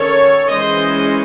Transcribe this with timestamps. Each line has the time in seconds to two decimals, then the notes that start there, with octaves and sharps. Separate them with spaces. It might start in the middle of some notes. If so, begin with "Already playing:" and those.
Already playing: D#3 C#4 A4 C#5
0.50 E3 G#3 C#4 C5 D#5